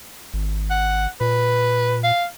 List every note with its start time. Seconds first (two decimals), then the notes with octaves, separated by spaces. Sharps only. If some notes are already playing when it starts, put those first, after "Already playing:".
0.34 G#1
0.70 F#5
1.21 A#2 B4
2.04 F5